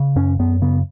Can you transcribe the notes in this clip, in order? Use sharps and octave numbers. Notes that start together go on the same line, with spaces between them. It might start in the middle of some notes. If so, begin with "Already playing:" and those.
Already playing: C#3
F#2 C#4
F#2 B3
C#3 B3